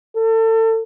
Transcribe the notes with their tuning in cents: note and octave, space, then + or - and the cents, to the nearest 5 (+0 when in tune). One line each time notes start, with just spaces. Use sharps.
A4 +30